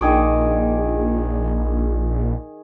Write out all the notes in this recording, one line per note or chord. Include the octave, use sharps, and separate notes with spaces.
A#1 D#3 G#4 D6